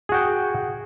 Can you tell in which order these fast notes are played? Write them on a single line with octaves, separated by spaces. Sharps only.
G#4 F#4 G5